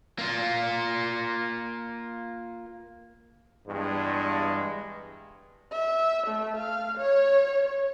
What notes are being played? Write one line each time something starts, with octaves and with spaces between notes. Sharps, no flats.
A#3 F4
E2 G2 G#3
E5
A3
F5
C#5